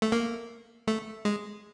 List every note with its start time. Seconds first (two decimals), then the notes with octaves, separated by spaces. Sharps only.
0.02 A3
0.12 A#3
0.87 A3
1.25 G#3